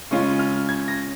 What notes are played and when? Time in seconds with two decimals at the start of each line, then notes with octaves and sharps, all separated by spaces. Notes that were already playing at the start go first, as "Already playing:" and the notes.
0.11 C#3 G#3 C#4 F4 C#6
0.39 F6
0.69 G#6
0.88 A#6